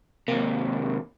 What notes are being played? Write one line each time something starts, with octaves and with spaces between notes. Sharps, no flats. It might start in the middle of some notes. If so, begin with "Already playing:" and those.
D#2 C3 A#3